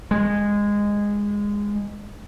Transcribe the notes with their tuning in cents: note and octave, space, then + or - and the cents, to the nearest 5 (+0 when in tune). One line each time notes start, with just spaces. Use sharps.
G#3 -15